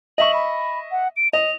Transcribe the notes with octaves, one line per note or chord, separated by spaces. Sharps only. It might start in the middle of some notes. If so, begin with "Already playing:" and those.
D#5 E5 C#6 F#7
B5
F#5
D7
D#5 F7